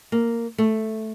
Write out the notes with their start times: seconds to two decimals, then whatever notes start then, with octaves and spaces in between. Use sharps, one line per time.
0.12 A#3
0.58 A3